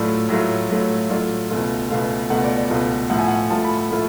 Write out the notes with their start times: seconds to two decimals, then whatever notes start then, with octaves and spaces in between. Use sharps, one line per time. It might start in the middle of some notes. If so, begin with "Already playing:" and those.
Already playing: A2 F#3 A3 F4 D5
0.29 A2 F#3 A3 F4
0.69 A2 F#3 A3 F4
1.09 A2 F#3 A3 F4 D5
1.50 C#2 B2 A3 F4
1.89 C#2 B2 A3 F4 F5
2.30 C#2 B2 A3 F4 F#5
2.44 D5
2.57 D5
2.70 C#2 B2 A3 F4
3.10 A2 F3 A3 F4 F#5
3.19 G#5
3.28 F#5
3.50 A2 F3 A3 F4 A5
3.64 B5
3.77 B5
3.90 A2 F3 A3 F4 B5